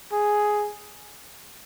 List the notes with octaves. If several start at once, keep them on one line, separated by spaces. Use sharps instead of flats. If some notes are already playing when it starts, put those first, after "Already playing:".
G#4